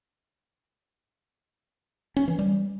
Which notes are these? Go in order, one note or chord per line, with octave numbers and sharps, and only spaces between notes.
C#4
E3
G3